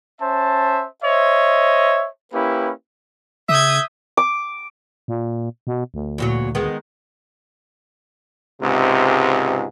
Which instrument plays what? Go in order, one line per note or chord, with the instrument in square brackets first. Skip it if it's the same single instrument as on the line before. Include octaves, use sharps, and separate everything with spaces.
[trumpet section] C#4 C5 E5 A5
C5 C#5 D#5 E5
A#3 C#4 E4 G4 B4
[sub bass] C#3 [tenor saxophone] E5 [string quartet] D#6 G6 G#6
[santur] D6
[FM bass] A#2
B2
D2
[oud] E2 A#2 F#3
D#3 G#3 B3
[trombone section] C#2 G#2 C3